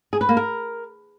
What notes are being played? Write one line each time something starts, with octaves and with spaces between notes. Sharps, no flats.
G#4
B4
A#3
A#4